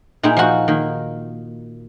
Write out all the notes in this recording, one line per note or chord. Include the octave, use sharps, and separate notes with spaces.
A#2 D#4 E4 G#4 G5
F3 F#4
D#3 A#3